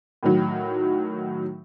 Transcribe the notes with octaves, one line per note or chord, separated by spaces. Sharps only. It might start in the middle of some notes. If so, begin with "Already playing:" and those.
A2 D#3 F#3